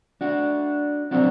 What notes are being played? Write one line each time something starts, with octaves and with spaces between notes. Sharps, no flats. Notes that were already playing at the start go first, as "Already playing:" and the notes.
D4 F#4
C3 F#3 C4 D4 F#4